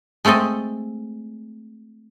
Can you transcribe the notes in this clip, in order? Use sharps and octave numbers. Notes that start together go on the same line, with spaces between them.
G#3 A3 C4 A4 D#5